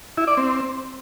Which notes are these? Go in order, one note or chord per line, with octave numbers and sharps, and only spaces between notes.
E4
D5
C4